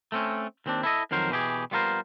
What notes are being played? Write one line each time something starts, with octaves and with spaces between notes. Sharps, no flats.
A3 C4 C#4
D#2 C4 D4
E4 A4 D#5
F2 D#3 F#3 A#4 C5
B2 E3 G4 G#4
G3 B3 F4 F#4 A#4 C5